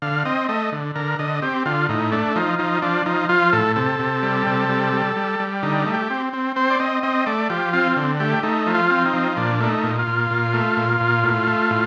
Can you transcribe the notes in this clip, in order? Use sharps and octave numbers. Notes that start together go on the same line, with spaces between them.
D3 F5
C4 D#5
A3 D#5
D3
D3 A#4
D3 D#5
C4 G4
D3 F4
A2 D#4
A3 D4
F3 D#4
F3 D#4
F3 D4
F3 D#4
F3 F4
A2 A4
C3 A4
C3
G3
C3
G3
G3
G3
G3
D3 D#4
A3
G4
C4
C4
C4 C5
D5
C4 D#5
C4 D#5
A3 D5
F3 G4
C4 F4
D3
A3 G4
A3 D#4
F3
F4
C4
D#4
F3
A#2 D4
A3 D4
D#4
A#2
F4
A#2
A#2
A3
A#2
A#2
A2
A3
A2